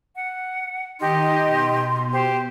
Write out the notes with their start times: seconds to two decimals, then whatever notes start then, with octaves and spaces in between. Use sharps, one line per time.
0.15 F#5
1.01 D#3 D#4 G4 D#5 C6
1.45 B2
2.13 G4 C5